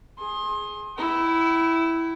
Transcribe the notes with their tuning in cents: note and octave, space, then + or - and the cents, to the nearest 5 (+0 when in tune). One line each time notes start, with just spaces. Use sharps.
G#4 +10 C6 +30
E4 +0 G5 -45